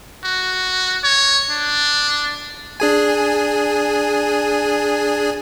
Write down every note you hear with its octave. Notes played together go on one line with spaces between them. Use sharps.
F#4
C#5
D4
D4 G#4 G#5